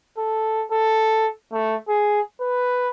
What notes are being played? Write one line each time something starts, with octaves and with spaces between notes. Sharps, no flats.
A4
A4
A3
G#4
B4